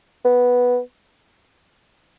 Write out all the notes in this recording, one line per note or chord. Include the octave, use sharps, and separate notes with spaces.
B3